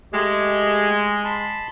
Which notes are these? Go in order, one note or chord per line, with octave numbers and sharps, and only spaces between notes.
G#3 A3 G4 D#5
G#5
A5 B5 C6